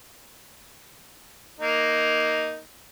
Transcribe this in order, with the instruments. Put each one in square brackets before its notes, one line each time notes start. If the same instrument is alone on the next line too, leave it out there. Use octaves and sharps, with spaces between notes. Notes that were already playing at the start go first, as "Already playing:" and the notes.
[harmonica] A#3 D#4